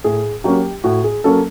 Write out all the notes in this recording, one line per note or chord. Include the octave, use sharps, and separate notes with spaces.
A2 G#4
F#3 A#3 C#4 G4
A2 F#4
G#4
F#3 A#3 C#4 A4